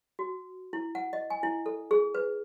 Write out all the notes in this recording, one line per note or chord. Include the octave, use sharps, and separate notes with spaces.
F#4
E4
F#5
D#5
G#5
E4
A4
G#4
B4